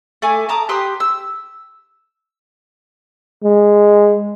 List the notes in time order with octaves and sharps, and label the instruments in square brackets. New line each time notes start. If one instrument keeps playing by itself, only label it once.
[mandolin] A3 G#5 D6
A5 A#5 D6 D#6
G4 B4 C6 D#6
E6
[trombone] G#3